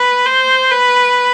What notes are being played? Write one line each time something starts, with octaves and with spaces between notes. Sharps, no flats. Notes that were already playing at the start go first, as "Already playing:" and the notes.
Already playing: B4
C5
B4